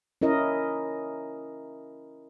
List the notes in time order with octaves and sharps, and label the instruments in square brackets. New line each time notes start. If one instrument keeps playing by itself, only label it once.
[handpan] C#4 E4 A#4 D#5